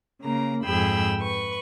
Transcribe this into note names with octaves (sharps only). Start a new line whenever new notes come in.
C#3 A#3 A#5
F2 G#2 G#4 G5 B5 E6
B4 C#6